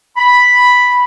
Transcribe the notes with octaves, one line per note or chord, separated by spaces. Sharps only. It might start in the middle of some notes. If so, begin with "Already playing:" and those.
B5